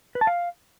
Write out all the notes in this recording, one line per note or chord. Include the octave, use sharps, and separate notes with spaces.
B4
A5
F5